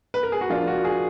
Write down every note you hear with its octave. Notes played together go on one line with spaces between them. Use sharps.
B4
A#4
G#4
F#4
F3 A#3 D4 F4
F#4
G#4